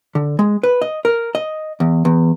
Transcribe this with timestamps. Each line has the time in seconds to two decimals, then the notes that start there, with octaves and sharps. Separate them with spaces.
0.15 D3
0.39 G#3
0.63 B4
0.82 D#5
1.05 A#4
1.35 D#5
1.80 E2
2.05 E2